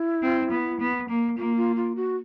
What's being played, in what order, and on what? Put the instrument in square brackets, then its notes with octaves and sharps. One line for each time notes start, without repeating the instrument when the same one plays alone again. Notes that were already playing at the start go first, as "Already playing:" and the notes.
Already playing: [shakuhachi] E4
[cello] C4
B3
B3
A#3
[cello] A#3 [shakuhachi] F4
[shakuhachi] F4
F4
F#4